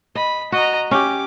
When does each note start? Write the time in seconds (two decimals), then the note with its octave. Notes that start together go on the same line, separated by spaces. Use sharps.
0.15 D#5 B5
0.52 F#4 D#5 A#5
0.91 C#4 G4 D6